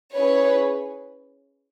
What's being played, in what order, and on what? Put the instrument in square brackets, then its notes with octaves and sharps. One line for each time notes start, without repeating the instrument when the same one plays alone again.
[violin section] C#4 E4 G#4 B4 C#5